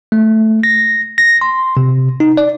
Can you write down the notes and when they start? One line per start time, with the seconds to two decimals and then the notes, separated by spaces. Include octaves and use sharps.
0.12 A3
0.63 A#6
1.18 A#6
1.41 C6
1.77 C3
2.20 D#4
2.37 D5